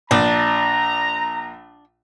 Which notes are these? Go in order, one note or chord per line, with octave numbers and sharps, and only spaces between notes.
A#1 D4 A#5